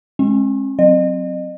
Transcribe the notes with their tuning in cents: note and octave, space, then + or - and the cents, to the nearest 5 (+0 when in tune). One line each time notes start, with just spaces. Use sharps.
G#3 +20 C#4 -45
F#3 +0 C4 +0 D#5 -35